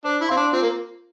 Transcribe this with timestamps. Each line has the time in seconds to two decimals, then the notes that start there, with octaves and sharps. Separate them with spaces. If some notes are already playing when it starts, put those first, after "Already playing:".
0.05 D4 C5
0.21 E4
0.28 C4 F5 C6
0.37 D4
0.53 C4 F4
0.63 A#3